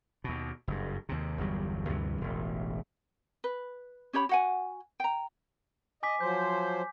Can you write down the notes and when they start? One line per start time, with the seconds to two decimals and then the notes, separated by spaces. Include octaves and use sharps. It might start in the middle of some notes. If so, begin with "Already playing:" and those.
0.24 D#2 B2
0.68 F#1 G2
1.09 D#2 C3
1.39 G1 E2 F#3 G3
1.89 D2 G2 C3 E3
2.21 E1 A1
3.44 B4
4.13 C#4 G4 C#5 B5
4.29 F#4 F#5 G#5
5.00 G5 A#5
6.03 D#5 G#5 D6 B6
6.21 F3 F#3 C5 G6